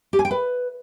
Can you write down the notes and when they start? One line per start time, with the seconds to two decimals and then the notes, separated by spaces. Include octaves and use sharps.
0.13 G4
0.19 G#5
0.25 G5
0.31 B4